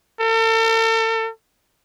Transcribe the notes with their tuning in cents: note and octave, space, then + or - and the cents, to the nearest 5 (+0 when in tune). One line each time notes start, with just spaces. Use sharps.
A4 +40